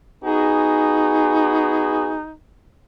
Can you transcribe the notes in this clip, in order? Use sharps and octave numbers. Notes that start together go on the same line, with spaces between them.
B3 D#4 F#4 G#4